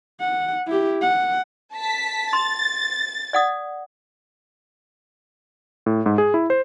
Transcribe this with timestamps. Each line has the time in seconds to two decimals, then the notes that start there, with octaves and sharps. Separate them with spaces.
0.20 F#5
0.67 E4 G4
1.01 F#5
1.74 A5 B6
2.33 C6 A6
3.33 D5 F#5 D#6
5.86 A2
6.06 G#2
6.18 G#4
6.34 E4
6.50 C5